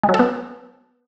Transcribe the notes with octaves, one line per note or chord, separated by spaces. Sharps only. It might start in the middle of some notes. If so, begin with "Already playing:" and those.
G#3
F#3
A4
B3